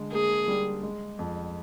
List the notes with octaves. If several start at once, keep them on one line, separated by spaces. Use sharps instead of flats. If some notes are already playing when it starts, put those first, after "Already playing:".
Already playing: D3 G#3
A#3 G#4
G3
G#3
F2